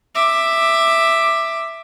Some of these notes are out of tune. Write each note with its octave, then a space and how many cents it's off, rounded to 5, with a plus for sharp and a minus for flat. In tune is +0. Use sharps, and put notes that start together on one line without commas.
E5 +0 D6 +15